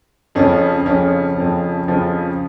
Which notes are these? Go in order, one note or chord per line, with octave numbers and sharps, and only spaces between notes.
F2 C#3 F3 C#4
F2 C#3 F3 C#4
F2 C#3 F3
F2 C#3 F3